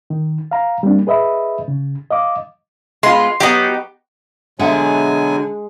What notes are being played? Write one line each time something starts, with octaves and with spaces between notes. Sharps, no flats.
D#3
F5 A#5
G3 A#3 C4 D4
G#4 B4 D#5 E5 B5
C#3
D#5 F5 D6
G#3 B3 F4 C6
F#3 B3 D#4 G4
B2 D3 F#3 G#3 E5 F#5 G#5